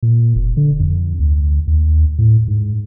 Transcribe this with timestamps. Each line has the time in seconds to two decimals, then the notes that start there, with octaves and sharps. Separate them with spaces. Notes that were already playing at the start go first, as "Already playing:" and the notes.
0.03 A#2
0.36 F1
0.57 D3
0.80 F2
1.20 D2
1.67 D#2
2.18 A2
2.48 G#2